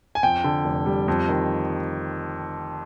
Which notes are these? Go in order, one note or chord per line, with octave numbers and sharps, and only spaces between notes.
G#5
F2 G5
D3
F1
G3
F2
D#3